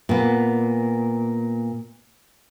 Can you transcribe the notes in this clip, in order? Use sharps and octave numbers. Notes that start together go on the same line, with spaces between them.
A#2 B3